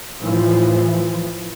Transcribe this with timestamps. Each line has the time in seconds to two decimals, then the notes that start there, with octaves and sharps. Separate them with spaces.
0.20 A2 E3 F3